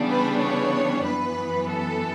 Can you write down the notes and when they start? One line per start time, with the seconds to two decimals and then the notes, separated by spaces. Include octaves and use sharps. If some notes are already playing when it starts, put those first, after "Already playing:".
Already playing: C#3 E3 G3 B3 D4
0.09 B4
0.40 C#5
1.05 F#2 E3 B3 B4
1.70 A4